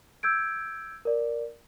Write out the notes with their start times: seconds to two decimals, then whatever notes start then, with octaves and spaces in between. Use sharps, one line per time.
0.23 E6 G6 G#6 D7
1.05 A#4 D5